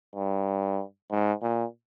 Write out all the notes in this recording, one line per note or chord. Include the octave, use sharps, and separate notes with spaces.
G2
G#2
A#2